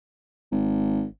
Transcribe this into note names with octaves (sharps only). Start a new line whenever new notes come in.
G#1